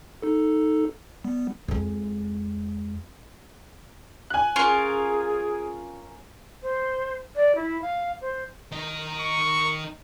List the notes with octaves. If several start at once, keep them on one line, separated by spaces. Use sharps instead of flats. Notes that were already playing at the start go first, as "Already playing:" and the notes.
D#4 A4
G3 B3
F2 G#3
G#5 F#6
C#4 F4 G#4 A#4
C5
D5
E4
F5
C5
D#3 D#5
C#6